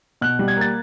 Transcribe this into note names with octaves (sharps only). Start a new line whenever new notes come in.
B2 F#6
G3
G#6
A#3 A6